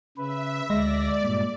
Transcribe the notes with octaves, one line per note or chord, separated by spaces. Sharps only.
C#3 B4 E5
D2 G#3 D5 E5 A#6
G2 A#2